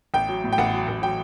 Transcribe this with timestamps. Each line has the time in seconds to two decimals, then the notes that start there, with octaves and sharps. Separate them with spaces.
0.14 A1 G5
0.28 F#3
0.44 A2
0.53 G5
0.58 A1 F#5
0.72 F#3
0.88 A1
1.02 F#3 G5